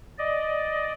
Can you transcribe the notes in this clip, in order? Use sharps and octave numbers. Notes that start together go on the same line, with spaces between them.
D5 D#5